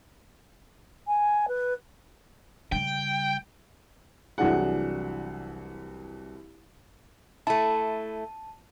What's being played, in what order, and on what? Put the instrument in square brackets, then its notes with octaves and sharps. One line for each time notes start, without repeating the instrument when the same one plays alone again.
[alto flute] G#5
B4
[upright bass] C#3 G3 [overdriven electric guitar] G5
[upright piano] C2 E3 F#3 D4 G#4 F#5
[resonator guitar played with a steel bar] A3 E4 [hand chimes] A5